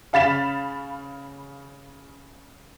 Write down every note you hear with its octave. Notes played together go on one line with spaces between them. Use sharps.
C#3 F5 B5 A6 B6 E7